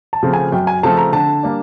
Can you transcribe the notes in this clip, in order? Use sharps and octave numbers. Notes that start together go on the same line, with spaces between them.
A5
C#3 F3 A3 C4
G#5
F#2 G5
G#5
C#3 F3 A3 C4 A5
A#5
D3 A5
G3 A#3 D4